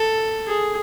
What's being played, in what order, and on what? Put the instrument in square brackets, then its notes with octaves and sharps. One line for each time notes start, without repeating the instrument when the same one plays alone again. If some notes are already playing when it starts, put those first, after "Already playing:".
Already playing: [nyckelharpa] A4
G#4